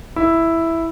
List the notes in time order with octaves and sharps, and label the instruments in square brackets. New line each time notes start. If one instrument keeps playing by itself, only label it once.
[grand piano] E4